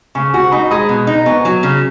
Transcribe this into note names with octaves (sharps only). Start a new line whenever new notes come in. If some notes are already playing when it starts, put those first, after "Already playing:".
C#3 G#5 C#6
F#4 G#5 C#6
D#4 B5 D#6
G#3 B5 D#6
B2
D#4
B3 G#5 C#6
F#3
C#3